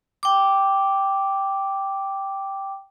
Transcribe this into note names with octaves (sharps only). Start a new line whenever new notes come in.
G5 D6